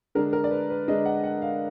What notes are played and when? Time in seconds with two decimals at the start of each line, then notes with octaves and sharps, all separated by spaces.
0.15 D3 G#3 D4 A#4
0.33 A#4
0.44 D5
0.51 B4
0.70 B4
0.88 D3 G#3 D4 D#5
1.05 F#5
1.24 F#5
1.42 F5